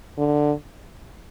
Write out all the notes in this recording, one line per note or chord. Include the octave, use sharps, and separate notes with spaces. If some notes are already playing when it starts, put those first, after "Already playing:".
D3